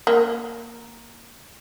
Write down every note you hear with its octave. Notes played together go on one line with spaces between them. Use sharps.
A#3